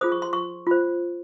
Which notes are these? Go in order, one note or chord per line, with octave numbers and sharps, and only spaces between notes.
F4 G#4 C5 D#6
C#6
C6
C#6
F4 C5